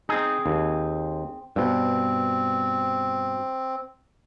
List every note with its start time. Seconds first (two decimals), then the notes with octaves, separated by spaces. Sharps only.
0.09 C4 D#4 G#4
0.46 D#2
1.56 G2 B2 C4